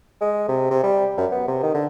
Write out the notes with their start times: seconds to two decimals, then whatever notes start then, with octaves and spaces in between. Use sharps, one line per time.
0.21 G#3
0.49 C3
0.71 C3
0.83 G3
1.18 F#2
1.32 B3
1.48 C3
1.63 D#3
1.74 D3